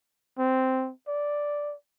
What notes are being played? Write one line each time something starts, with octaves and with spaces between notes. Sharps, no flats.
C4
D5